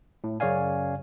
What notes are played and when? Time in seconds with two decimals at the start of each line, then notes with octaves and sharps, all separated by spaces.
0.24 A2
0.40 F#2 C#3 C#5 D5 F5 G#5